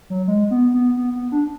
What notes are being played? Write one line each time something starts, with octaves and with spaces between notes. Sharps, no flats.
F#3
G#3
B3
B3
B3
B3
D4